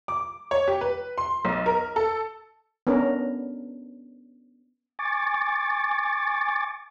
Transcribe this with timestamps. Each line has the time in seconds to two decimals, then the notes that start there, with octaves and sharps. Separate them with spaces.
0.08 D6
0.51 C#5
0.68 G4
0.81 B4
1.18 C6
1.45 B1
1.66 A#4
1.96 A4
2.87 B3 C#4 D4 A#4
4.99 G#5 C#6 D6 A6